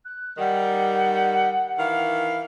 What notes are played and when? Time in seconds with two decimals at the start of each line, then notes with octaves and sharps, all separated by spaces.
0.04 F#6
0.38 D#3 G3 F#5
1.79 D#3 E3 F5